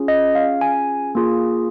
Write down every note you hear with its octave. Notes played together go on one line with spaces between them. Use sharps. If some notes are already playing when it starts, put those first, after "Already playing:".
Already playing: C#4 F4 G#4
D#5
F5
G#5
A#3 F4 G#4